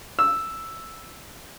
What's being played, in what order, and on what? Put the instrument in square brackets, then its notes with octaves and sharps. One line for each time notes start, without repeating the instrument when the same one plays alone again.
[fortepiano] E6